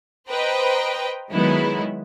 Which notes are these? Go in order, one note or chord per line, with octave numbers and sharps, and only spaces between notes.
B4 C5 D#5 G5 A#5
D#3 F#3 G#3 B3 D#4 E4